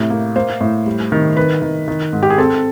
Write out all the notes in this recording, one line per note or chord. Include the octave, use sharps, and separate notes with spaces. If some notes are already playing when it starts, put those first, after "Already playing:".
Already playing: A2 C3
A#3
A#3 C5
A2
G3
D#3
D#3 B4
D#3
D#3
G#2
G4
G#4
C4 A4